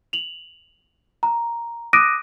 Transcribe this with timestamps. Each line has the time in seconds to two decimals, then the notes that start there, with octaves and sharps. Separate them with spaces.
0.13 F7 F#7
1.23 A#5
1.93 D6 D#6 F#6 A#6 D7 D#7